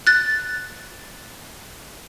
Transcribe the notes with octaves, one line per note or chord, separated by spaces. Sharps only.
F#6 A6